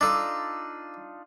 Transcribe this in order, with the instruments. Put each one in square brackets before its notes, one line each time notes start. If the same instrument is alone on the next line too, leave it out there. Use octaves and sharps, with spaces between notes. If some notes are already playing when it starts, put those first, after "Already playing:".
[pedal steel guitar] D4 D#4 F4 [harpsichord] A4 D5